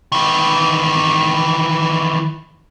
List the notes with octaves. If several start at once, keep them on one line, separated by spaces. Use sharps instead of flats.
D#3 E3